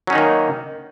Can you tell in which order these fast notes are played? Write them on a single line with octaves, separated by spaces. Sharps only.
F#3 C#4 D#4 D#3 A#3